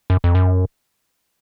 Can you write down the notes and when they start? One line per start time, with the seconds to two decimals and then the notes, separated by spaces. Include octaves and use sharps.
0.10 F#2
0.24 F2
0.35 F#2